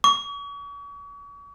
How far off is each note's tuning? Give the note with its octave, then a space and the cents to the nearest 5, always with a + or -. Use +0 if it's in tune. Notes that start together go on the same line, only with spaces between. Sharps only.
C#6 +40